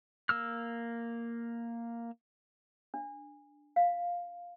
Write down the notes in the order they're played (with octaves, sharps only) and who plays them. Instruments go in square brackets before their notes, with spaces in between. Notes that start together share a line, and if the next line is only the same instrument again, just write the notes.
[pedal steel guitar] A#3 E6 F6
[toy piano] D4
F5